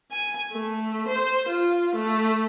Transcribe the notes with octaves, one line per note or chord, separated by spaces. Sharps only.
G#5
A3
C5
F4
A3